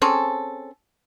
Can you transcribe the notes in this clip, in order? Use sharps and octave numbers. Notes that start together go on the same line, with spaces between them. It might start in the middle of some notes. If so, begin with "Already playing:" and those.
C4 C#4 G#4 A4